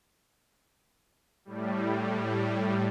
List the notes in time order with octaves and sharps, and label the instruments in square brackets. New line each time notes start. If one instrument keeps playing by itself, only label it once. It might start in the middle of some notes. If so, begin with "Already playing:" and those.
[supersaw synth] A2 G3